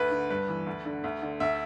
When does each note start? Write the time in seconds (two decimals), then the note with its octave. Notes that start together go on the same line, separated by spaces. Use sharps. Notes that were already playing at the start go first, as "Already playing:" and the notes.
Already playing: D2 B4
0.11 D3
0.30 G2 B4
0.48 E3
0.66 D2
0.85 D3
1.04 D2
1.22 D3
1.40 D2 E5